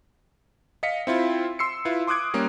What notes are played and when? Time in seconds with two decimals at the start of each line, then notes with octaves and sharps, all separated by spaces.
0.83 D#5 F5 B6 C#7
1.07 C4 E4 F4
1.59 C6 E6 C7 C#7
1.85 E4 F4 B4
2.07 C6 D6 D#6 F#6 G#6 D7
2.34 G3 A#3 C#4